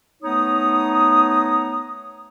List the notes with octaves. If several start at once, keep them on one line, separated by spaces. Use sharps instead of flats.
A3 B3 D#4 C#5 A#5 D#6